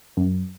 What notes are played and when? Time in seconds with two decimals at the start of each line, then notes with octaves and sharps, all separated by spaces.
0.17 F#2